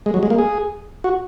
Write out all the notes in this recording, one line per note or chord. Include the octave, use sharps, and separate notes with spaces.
G#3
F#3
G#3
A#3
G#4
F#4